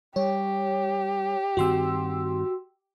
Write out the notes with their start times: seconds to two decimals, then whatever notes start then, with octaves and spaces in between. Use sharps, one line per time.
0.16 G3 G4 C#5
1.57 G2 D#3 C4 F#4 C6 E6